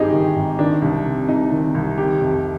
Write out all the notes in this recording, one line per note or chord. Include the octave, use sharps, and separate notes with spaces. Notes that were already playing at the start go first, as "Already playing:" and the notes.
Already playing: G#1 G2 D#4 G4 G#4
D#3
G#1
D#3 D4
C2
C3
C2 D#4
D#3
C2
D#3 G4
F1